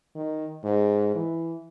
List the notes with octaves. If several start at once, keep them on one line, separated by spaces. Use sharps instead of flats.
D#3
G#2
E3